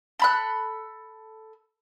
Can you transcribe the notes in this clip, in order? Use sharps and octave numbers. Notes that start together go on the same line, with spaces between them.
A4 B5 F#6